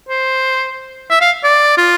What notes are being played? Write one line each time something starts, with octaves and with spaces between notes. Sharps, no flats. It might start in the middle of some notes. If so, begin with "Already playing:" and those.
C5
E5
F5
D5
F4